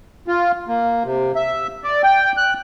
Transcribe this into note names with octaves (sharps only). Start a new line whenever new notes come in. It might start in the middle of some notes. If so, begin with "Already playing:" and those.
F4
A#3
C3
E5
D5
G5
F#6